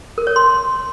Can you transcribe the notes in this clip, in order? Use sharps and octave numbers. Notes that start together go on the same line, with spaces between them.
A#4
C#5
C6